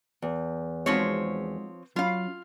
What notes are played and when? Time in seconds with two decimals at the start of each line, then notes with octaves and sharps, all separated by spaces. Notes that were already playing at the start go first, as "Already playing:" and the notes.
0.22 E2
0.86 F3 G#3 C4 D#4 F#4 C#5
1.96 F#3 C#4 F4 F5 B5